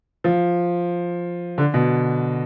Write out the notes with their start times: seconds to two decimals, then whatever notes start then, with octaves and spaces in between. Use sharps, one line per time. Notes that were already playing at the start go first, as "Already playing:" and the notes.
0.24 F3
1.58 D3
1.74 B2